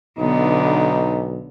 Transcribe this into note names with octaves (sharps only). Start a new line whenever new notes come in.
B1 D3 B3 D#4